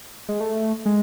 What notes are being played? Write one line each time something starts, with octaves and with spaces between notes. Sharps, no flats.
G#3
A3
G#3